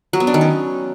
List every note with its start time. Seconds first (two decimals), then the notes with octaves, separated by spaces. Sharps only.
0.13 F#3
0.20 B3
0.27 D4
0.34 D#3
0.41 C#4